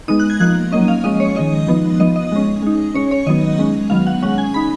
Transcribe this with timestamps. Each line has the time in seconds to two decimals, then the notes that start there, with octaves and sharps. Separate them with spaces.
0.08 G#3 B3 D#4 D#6
0.20 F#6
0.30 G#6
0.40 F3 A#3 D#4 F#6
0.71 F#3 A#3 C#4 D#5
0.88 F5
1.04 F3 G#3 C#4 D#5
1.20 C#5
1.36 D#3 G#3 D#4 D#5
1.68 F3 B3 D#4
2.00 F3 B3 D#4 D#5
2.16 D#5
2.32 G#3 C#4
2.62 G#3 D#4
2.94 G#3 C#4 C#5
3.11 C#5
3.27 D#3 F#3 B3 D#4 D#5
3.59 G#3 C#4
3.90 D#3 F#3 B3 F5
4.07 F#5
4.22 G#3 C#4 F#5
4.38 G#5
4.54 G#3 D#4 B5